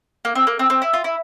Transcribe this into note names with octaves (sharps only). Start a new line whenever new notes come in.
A#3
C4
A#3
C4
C4
E4
F4
E4